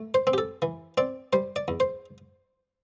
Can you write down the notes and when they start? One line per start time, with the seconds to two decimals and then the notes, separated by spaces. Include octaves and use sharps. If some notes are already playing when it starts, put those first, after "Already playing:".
Already playing: A3
0.14 C5
0.27 C4
0.33 G4
0.38 A4
0.62 E3
0.98 C4 D5
1.33 G3 C5
1.56 D5
1.68 E2
1.80 C5